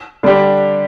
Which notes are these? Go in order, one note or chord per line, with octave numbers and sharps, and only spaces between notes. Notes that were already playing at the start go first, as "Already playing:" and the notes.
D3 G3 D4 G4